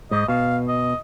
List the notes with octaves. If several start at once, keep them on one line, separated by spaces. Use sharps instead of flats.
G#2 D#5
B2 F5
D#5